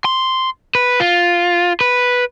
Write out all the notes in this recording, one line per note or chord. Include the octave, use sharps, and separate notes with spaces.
C6
B4
F4
B4